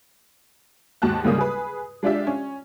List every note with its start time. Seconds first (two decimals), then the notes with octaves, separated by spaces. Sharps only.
1.02 D#2 G#2 F#4 A5 F#6
1.24 D2 G#2 C#3 G3 A#3 D#6
1.38 G#4 B4
2.03 G#3 D4 F4 G4 D5 E5
2.27 C#4